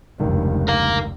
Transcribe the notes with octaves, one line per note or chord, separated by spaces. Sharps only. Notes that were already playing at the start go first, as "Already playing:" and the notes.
F1 C#2 G2 D#3
A#4 F5